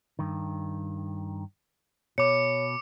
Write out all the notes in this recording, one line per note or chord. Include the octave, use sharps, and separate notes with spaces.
G2 D#3
B2 C#5 D6 C#7